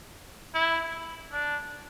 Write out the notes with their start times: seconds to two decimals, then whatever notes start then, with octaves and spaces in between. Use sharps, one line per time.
0.55 E4
1.33 D4